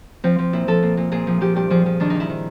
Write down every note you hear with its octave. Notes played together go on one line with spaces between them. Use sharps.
F3 C4
F3
A#2 E4
F3 A4
A#2
A#2
A#2 G#4
F3
F3 G4
G2 G4
F3 G#4
F3
D#3 D4
D#3 D#4
E4
D#3